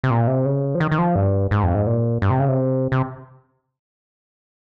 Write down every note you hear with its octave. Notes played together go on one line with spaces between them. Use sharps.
C3
A#2
C3
C#3
F3
D#3
D#3
F3
G2
G#2
F2
G#2
A#2
G2
C3
C#3
C3
C3